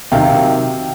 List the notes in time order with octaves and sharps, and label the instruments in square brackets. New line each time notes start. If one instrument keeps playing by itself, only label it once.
[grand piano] C3 D#3 F#3 F5 G5